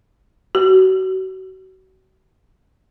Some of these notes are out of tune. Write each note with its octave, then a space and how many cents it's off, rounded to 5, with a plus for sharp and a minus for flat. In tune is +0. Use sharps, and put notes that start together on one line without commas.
F#4 +30